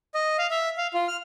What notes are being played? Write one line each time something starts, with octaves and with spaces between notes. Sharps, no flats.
D#5
F5
E5
F5
F4
F6